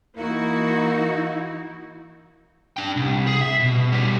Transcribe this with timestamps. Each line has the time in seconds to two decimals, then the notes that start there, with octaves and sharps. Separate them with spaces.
0.17 E3 A#3 D#4 E4 F#4
2.77 D4 G5
2.97 C2
3.27 G#4
3.41 E5
3.60 B2
3.92 B2 G3